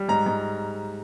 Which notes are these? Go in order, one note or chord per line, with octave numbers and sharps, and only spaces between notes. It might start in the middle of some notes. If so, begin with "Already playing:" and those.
Already playing: G3
G#2 A#5
G#2